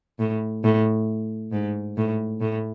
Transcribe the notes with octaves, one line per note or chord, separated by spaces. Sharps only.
A2
A2
G#2
A2
A2